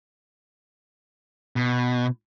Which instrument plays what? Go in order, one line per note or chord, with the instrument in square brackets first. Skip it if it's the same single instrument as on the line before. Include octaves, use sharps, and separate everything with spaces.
[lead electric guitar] B2